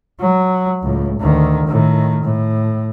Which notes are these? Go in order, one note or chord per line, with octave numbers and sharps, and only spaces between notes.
F#3
C#2 A2
D2 D#3
A2 D#3
A2